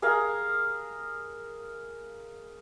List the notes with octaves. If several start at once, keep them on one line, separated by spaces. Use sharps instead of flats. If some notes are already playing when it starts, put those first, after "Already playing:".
G#4 A#4 D#5 F5